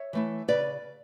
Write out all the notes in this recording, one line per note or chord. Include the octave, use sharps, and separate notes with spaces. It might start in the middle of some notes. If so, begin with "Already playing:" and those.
Already playing: C#5 E5
E3 A3 E4
C#3 B4 D5